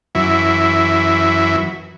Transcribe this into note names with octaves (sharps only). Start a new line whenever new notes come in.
F#2 E3